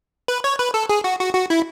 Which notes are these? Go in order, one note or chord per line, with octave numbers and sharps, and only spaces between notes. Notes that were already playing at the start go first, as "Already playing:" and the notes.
B4
C#5
B4
A4
G#4
F#4
F#4
F#4
E4